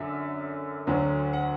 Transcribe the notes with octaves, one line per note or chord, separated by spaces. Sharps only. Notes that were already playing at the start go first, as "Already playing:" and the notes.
Already playing: F#2 D3 E5
D2 D3 F#3
F#5